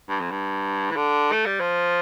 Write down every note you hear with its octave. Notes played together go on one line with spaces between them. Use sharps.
G2
F2
G2
E3
D3
A3
G3
F3